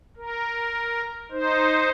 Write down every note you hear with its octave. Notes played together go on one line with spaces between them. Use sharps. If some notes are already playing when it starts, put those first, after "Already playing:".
A#4
D#4 C5